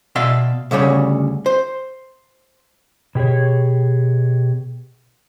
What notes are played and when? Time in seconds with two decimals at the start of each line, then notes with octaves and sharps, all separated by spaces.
0.15 B2 D5 E5 F5 C6
0.71 D2 C#3 G3 C#5
1.46 C5
3.15 B2 G4 G#4 C#5